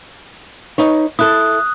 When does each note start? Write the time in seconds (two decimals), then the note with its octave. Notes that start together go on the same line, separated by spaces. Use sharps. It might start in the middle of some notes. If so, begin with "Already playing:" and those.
0.78 D#4 B4 C#5
1.19 E4 A4 D#6 F#6